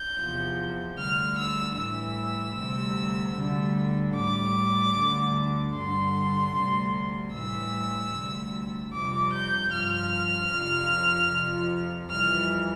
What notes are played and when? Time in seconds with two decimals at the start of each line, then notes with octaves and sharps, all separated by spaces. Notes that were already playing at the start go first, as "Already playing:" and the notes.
Already playing: G6
0.18 E2 C3 F3
0.98 D2 D3 G3 F6
1.37 E6
1.77 A2 E3 G3 E6
2.57 D2 C3 G3
3.36 D2 D3 G3
4.15 A2 G3 D6
4.95 D2 D3 G3
5.74 G2 D3 G3 C6
6.54 D2 C3 G3
7.33 A2 E3 G3 E6
8.13 D2 C3 G3
8.93 F2 C3 G3 D6
9.33 G6
9.72 G2 F3 F6
10.51 F2 C3 F3
11.31 F2 C3 F3
12.10 F2 E3 G3 F6